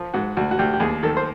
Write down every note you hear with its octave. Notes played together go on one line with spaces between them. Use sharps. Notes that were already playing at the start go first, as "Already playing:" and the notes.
Already playing: F3
G#2 F#4
D2 F#4
F#4
D2 G4
G4
D#2 G#4
D#3 A4
C5